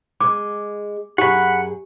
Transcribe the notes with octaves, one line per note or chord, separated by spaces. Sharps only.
G#3 D6
F#2 G4 G#4 F#5 B5